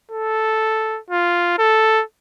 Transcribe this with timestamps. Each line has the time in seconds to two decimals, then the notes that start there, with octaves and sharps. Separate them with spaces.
0.12 A4
1.10 F4
1.58 A4